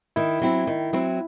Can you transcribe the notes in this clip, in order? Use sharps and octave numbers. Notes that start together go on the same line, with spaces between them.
D#3 E4
F#3 C4 E4
D#3
F#3 C4 E4